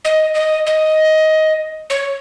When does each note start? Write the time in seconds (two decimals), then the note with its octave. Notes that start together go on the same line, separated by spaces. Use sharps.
0.05 D#5
0.35 D#5
0.67 D#5
1.90 C#5